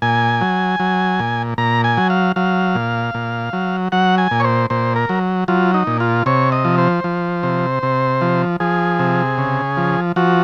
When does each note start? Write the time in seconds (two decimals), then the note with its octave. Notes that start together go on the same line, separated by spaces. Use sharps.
0.02 A#2 G#5
0.41 F#3
0.80 F#3
1.19 A#2
1.58 A#2 A#5
1.84 G#5
1.97 F#3
2.10 F5
2.36 F#3 F5
2.75 A#2
3.14 A#2
3.53 F#3
3.92 F#3 F#5
4.18 G#5
4.31 A#2
4.40 C#5
4.44 C5
4.70 A#2 C5
4.96 A#4
5.09 F#3
5.48 F#3 F4
5.74 D#4
5.87 A#2
6.00 F4
6.26 C3 C#5
6.52 D#5
6.65 F3
6.78 C5
7.04 F3
7.43 C3
7.83 C3
8.21 F3
8.60 F3 G#4
8.99 C3
9.38 C#3
9.77 F3
10.16 F3 F#4